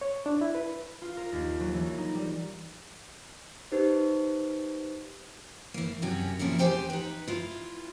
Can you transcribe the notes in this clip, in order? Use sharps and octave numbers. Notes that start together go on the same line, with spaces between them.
C#5
D4
E4
B4
F4
A#4
D#2
F#3
E3
D#4
G3
D#4 G4 B4 C5
E3 A#3
F#2 C3 C#4 F#4
A#2 F3 A#3 C#4 E4
E2 G#3 G4 C5 G5 G#5
D#4 B4
E4 F4